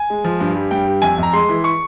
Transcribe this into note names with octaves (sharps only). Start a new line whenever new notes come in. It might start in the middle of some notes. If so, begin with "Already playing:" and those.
Already playing: G#5
G#3
F3
G2
G3
G2 G5
G3
F2 G#5
F2 A#5
G#3 C6
E3
C#6